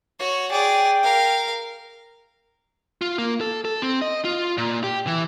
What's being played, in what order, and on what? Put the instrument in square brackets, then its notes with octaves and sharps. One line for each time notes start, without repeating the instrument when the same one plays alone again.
[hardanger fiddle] F#4 C#5
[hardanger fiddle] G#4 D5 [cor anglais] G5
[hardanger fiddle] A#4 F5
[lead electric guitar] F4
A#3
A4
A4
C4
D#5
F4
A#2
G4
E3